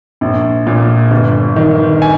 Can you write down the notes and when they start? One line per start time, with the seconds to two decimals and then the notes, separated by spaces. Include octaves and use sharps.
0.21 A#1
0.67 A#2
1.11 G1
1.56 D#3
2.02 G#5